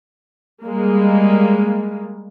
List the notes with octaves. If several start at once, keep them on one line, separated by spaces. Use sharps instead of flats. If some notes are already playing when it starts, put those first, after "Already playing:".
G3 G#3 A#3